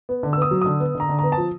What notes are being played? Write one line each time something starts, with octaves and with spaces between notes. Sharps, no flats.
B3
D3
E6
B3 D#6
F#3
D3 D#6
B3
D3
A#5
D3
B3 A#5
A5
F3